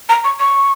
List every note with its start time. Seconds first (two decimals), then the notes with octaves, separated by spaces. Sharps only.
0.09 A#5
0.24 C#6
0.40 C#6